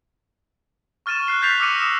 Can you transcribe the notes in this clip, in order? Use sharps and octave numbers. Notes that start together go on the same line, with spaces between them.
C#6 F6 A6 D#7 E7
F#6 C7 G7
F6 G6 A6 B6 C7 F7
D6 E6 F6 A#6 C#7 D#7
D#6 E6 E7